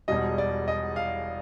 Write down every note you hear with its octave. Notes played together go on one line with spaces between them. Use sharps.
E1 E2 B2 G3 D#5
D5
D#5
F5